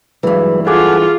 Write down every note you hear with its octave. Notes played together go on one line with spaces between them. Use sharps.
G2 E3 F#3 G#3 B4
F4 G#4 A4 F#5 G#5 D6